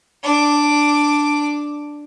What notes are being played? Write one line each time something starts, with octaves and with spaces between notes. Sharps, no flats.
D4 D6